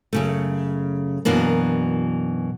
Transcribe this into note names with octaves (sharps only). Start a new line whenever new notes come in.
F#2 C#3 A3
F#2 B2 E3 A#3 D4